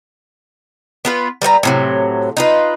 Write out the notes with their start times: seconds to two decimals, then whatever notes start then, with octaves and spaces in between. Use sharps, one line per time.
1.05 B3 F4 B4
1.42 G3 B4 F5 A#5
1.63 A2 C3 F#3
2.37 D#4 F4 B4